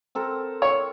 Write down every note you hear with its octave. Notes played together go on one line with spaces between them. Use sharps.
C4 A4 A#4
C#5